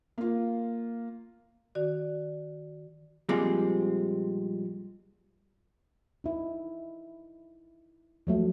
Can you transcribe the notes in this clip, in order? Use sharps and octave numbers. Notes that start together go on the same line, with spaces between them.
A#3 F4
D#3 F#4 D5
A#2 F3 G3 G#3 C4
D#4 E4
F3 F#3 A3